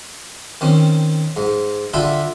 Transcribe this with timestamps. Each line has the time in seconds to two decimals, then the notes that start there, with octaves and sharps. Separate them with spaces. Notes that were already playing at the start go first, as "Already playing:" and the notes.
0.61 D#3 C4 C#4
1.37 G#2
1.94 D3 F4 A4 E5 G5 B5